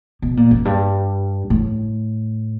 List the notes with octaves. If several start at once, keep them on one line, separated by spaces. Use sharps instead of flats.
B2
A#2
F#2
G2
A2